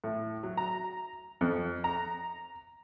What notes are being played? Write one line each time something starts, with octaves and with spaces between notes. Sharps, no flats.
A2
F#3
A#5
F2
A#5